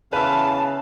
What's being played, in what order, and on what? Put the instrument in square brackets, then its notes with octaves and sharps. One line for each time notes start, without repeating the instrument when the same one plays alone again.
[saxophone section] E2 F5 [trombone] C#3 [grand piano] B4 E5 [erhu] A5